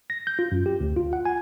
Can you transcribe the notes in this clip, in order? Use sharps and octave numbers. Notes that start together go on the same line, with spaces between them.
A#6
G6
F4
F#2
G4
D2
F4
F#5
G#5